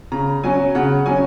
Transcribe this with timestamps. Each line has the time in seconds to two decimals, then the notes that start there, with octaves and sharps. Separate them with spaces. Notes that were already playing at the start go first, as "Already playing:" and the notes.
0.12 C#3 A#5
0.43 F#3 C#4 G#5
0.75 C#3 F#5
1.06 F#3 C#4 G#5